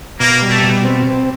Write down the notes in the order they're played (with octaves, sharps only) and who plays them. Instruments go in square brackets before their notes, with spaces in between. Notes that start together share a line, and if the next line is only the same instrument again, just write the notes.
[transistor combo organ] B2 [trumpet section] A#3
[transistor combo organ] G3
[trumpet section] A3
[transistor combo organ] B2
C4